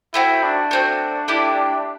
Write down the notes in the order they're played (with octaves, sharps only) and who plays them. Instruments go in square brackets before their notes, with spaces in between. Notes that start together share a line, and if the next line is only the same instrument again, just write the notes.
[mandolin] A3 C4 F#4 [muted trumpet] E4
[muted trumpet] D4
[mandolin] A3 C4 F#4
A3 E4 G4